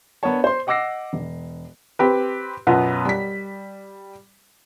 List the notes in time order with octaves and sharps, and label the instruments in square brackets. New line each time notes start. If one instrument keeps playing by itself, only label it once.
[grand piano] B3 D4 A#4 C#5 A5
C5 C6
D#5 F#5 D6 E6 A#6 C7
E1
[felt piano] C4 G4 B4
F#2 B2 B3 F4
G3 B6